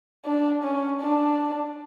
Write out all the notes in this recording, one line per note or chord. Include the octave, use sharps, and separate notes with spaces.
D4
C#4
D4